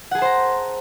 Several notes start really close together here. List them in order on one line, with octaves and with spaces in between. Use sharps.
F#5 G#4 A5 C5 A#5